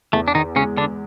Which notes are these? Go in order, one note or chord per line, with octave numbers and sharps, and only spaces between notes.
E2 A3
D4
D#3 D#4
C#3 G#3 C#4
D3 D4